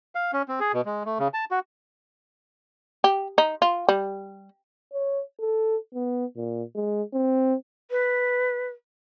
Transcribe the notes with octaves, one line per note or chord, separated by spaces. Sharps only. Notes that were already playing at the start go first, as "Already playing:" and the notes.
F5
C#4
C4
G#4
B2
G#3
A3
C#3
A5
F#4
G4
D#4
F4
G3
C#5
A4
B3
A#2
G#3
C4
B4